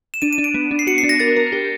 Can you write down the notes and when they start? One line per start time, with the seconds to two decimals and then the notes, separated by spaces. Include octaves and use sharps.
0.14 E7
0.22 D4 D#7
0.33 D#7
0.38 D4
0.44 D7
0.54 B3
0.71 D4
0.79 C7
0.87 F#4 C#7
0.98 C7
1.03 D4
1.09 A#6
1.20 A#4 A6
1.37 A#4
1.52 G4